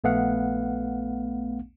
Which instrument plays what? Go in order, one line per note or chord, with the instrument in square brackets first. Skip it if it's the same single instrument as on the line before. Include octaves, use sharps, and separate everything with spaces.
[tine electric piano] A#1 A3 B3 F5 F#5